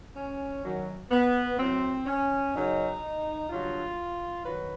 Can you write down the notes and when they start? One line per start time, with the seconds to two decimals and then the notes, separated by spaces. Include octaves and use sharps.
0.16 C#4
0.63 F#2 D#3 F#3
1.11 B3
1.59 A2 F#3 C4
2.07 C#4
2.54 F#2 C#3 F#3 D#4
3.50 G2 D3 F#3 F4
4.45 D#3 F#3 B4